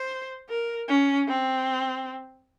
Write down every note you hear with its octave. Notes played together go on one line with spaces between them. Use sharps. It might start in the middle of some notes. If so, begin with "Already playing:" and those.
Already playing: C5
A#4
C#4
C4